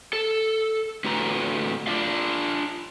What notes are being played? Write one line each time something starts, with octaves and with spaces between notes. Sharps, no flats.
A4
A2 D3 F#4 B4 A#5
D4 F4 D5 F5